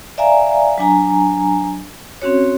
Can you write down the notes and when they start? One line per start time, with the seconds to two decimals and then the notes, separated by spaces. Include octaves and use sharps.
0.18 D5 E5 F5 G#5 A#5
0.78 F#3 D4 G#5 A#5
2.22 C4 C#4 F#4 C#5